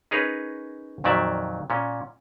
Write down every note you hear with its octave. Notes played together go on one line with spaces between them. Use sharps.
C#4 D#4 G#4 A#4 B4 C#5
F2 A#2 D#3 F#3 D5 E5
A#2 C#4